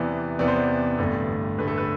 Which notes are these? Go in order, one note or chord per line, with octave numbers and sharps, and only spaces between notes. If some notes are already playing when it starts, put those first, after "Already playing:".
Already playing: E2 C3 E3 B3 D5
E2 C3 E3 B3 D5
C5
D5
A1 G2 D3 A3
A1 G2 D3 A3 B4
A4
B4